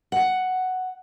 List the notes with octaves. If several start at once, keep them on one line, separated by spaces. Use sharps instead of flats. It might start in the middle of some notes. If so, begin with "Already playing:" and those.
F#5